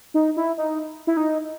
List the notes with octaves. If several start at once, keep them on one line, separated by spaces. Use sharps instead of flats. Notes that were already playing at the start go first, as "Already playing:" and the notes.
D#4
E4
D#4
E4
D#4